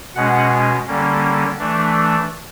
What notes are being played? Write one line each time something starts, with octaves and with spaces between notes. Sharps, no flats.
B2 G#3 C#4 F#5
D3 G3 A#3 C#4
E3 A3 D4